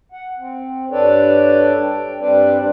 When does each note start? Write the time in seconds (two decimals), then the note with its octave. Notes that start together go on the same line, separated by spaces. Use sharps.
0.12 F#5
0.39 C4
0.91 G2 D4 A4 B4 C#5 D5
1.81 G5
2.19 G2 G3 C4 D4 B4 D5